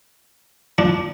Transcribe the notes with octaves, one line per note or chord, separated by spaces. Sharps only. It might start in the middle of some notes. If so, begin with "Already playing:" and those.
F3 D4